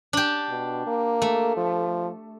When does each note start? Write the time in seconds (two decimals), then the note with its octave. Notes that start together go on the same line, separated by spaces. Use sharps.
0.13 D4 G4
0.49 B2
0.87 A#3
1.22 A3
1.57 F3